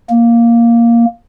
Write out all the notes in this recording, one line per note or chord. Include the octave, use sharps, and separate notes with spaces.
A#3